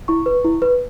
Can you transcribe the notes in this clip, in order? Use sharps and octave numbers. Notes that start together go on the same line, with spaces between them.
E4 C#6
B4
E4
B4